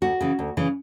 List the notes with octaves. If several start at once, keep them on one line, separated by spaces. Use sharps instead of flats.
D2 F#4
C#3 E3
D2
C#3 E3